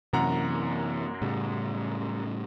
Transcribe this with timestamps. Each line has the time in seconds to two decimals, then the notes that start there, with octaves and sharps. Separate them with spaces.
0.13 F#2 C3 E3 A#3 F#5 A#5
1.22 A2 C#3 G3